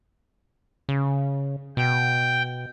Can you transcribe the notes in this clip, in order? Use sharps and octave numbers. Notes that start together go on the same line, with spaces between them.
C#3
B2 G5